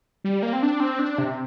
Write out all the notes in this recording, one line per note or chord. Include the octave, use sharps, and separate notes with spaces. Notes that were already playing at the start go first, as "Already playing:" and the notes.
G3
A#3
C4
D4
C4
D4
C3